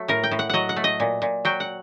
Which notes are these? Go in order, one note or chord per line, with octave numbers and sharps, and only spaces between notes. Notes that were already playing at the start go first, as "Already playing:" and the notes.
Already playing: F#3 A3
A2 A#4
G5
A2
F#5
F#3 D#5 F#5
F#5
A3
D#5
A#2
A#2
F#3 G5
F#5